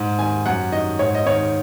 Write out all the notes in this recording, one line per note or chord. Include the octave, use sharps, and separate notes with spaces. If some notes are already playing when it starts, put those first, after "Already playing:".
Already playing: G#2
D#3 G#5
F#2 F#5
D#3 D#5
G#2 C#5
D#5
D#3 C#5